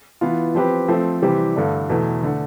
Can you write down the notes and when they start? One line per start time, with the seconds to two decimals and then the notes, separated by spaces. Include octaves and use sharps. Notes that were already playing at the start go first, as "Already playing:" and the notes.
0.21 E3 B3 F4
0.55 F3 C4 G4 B4
0.88 F3 A3 C4
1.22 C3 E3 G3 C4 G4
1.56 G2 D3 A3 D4
1.89 E2 B2 A3
2.23 D3 A3